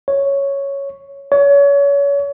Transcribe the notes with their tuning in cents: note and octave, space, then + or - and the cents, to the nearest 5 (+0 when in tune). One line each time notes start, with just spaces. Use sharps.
C#5 +0
C#5 +30